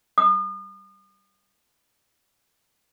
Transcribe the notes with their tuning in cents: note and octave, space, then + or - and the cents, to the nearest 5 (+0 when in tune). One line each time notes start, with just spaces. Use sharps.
D#6 -40